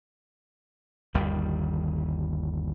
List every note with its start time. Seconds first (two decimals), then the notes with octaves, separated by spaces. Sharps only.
1.14 G1 D#2 D#3 G3